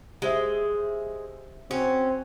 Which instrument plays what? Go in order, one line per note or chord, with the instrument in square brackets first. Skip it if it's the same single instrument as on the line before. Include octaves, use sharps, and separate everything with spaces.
[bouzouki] G#3 [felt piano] G4 C5 E5
[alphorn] C4 [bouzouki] C#4 [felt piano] F#4